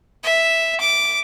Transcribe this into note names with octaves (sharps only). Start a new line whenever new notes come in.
E5
D6